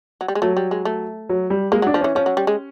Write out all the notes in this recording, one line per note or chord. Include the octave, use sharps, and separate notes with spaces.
F#3
G3
G#3
F#3 A3
G3
G#3
A3
F#3
G3
G#3 A#3
F#3
D4
F3
E3 C#4
F3 C#4
F#3
G3
G#3